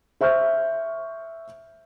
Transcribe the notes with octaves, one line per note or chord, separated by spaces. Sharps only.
C5 E5 C#6 F6 G6